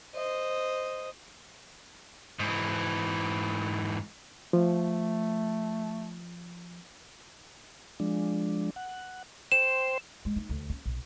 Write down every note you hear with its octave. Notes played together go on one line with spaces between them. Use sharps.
C5 D#5
G#2 E3
F3 A3
F3 G#3 D4
F#5
C5 G5 C6 E7
G#3
D#4
D2
C#4
B1